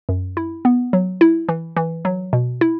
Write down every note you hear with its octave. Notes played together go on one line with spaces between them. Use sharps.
F#2
E4
B3
F#3
E4
E3
E3
F#3
B2
E4